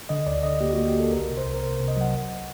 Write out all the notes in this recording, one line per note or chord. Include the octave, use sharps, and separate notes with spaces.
D3 D#5
D2 D5
D3 D#5
A#3 G4
A#3 F#4
G4
A#3 A4
C2 A#4
C3
C5
C2
A#4
C3 C5
C3
D#5
F#3 F#5
A1